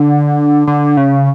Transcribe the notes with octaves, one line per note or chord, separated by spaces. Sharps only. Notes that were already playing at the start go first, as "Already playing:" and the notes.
Already playing: D3
D3
C#3